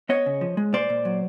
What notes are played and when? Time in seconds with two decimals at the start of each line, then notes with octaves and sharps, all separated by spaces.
0.09 B3 C#5 D#5
0.26 C#3
0.41 F3
0.57 G#3
0.73 A#2 C5 D5
0.90 A#2
1.05 F#3